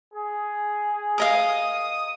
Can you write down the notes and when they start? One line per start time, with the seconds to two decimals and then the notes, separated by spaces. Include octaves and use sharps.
0.13 G#4
1.18 A#4 D#5 F5 D#6